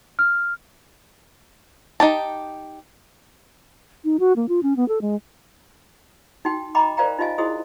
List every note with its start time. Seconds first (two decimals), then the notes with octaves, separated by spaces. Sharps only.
0.19 F6
2.00 D#4 G4 A5
4.04 D#4
4.20 F#4
4.36 A#3
4.49 F4
4.63 C#4
4.76 B3
4.88 A4
5.01 G#3
6.45 D#4 F#4 G5
6.75 D#5 G5 A#5 B5 D6
6.97 A#4 C5 D5 F5 G5 A#5
7.18 D#4 F4 G4 D#5 F5 G#5
7.38 E4 F#4 G#4 C5 D#5 D#6